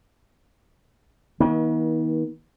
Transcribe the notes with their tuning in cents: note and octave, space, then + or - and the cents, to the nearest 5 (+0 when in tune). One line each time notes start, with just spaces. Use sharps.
D#3 +40 B3 -45